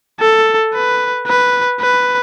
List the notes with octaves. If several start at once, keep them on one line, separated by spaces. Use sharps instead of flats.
A4
B4
B4
B4